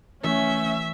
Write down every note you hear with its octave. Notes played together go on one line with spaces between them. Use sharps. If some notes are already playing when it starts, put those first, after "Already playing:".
E3 A3 C#4 E5